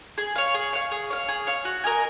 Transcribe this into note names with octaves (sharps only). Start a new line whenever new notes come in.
G#4
C#5 F5
G#4
C#5 F5
G#4
C#5 F5
G#4
C#5 F5
F#4
A#4 D#5 G#5